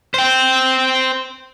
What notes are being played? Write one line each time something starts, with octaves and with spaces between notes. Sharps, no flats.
C5 G5